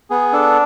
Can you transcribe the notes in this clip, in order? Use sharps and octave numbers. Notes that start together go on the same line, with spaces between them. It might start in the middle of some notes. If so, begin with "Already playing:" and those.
B3 G#4
D4 A4